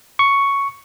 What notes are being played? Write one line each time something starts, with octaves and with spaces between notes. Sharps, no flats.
C#6